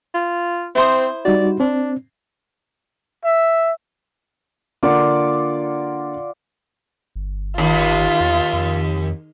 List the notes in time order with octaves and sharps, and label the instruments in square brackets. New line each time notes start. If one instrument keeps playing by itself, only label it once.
[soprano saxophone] F4
[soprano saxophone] C4 [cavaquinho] E4 C5 D#6
[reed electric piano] G3 D#4 F#4 [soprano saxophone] D5
[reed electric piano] C4 [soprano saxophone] D4
[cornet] E5
[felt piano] D3 A#3 D6 [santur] F4 D5 F#5
[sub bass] G1
[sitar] D#2 [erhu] F4
[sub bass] E2
F2